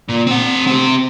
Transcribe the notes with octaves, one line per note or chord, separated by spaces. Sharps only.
A#2
C4 F#5
C4 G4